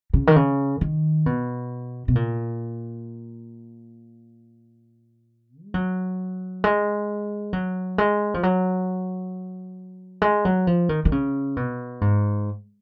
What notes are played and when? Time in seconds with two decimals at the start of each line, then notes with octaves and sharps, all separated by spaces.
0.13 C#3
0.27 D#3
0.36 C#3
0.81 D#3
1.26 B2
2.08 B2
2.15 A#2
5.63 G#3
5.74 F#3
6.64 G#3
7.53 F#3
7.98 G#3
8.34 F3
8.43 F#3
10.22 G#3
10.45 F#3
10.67 F3
10.89 D#3
11.05 D#3
11.12 C#3
11.57 B2
12.01 G#2